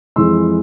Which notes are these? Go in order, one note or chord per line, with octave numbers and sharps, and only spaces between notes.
F2 E3 G#3 C6 E6